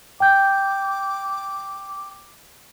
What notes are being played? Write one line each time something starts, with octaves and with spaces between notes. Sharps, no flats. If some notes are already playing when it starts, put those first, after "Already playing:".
G5 D6 G6